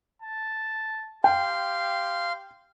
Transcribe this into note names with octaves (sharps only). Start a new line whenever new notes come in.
A5
G4 F5 G5 C6